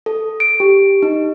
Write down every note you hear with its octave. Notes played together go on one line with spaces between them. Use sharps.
A4
D7
G4
D#4